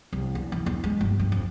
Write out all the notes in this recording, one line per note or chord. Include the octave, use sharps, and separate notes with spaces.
C2
E2
E3
E2
G#3
G1
G2
F2